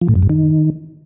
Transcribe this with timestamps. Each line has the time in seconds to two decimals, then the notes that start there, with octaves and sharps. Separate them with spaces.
0.02 F3
0.09 A2
0.15 F#2
0.22 G2
0.29 D#3